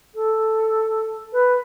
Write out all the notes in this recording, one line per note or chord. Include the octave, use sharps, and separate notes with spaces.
A4
B4